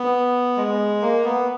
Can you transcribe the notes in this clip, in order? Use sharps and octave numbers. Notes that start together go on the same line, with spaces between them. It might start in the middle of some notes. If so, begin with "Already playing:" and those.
Already playing: B3
G#3
A#3
B3